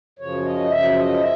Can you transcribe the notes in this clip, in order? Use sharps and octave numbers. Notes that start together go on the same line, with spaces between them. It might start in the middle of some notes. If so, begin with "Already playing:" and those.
F#2 C#3 F3 C#5
D#5
F#2 C#3 F3 E5
D#5
E5